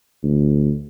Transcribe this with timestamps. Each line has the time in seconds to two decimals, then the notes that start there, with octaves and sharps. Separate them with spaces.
0.23 D2